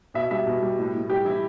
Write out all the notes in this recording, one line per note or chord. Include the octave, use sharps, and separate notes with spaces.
B2 E5
G3 E5
B2
G3
A2
A2
G3 G4
E3 E4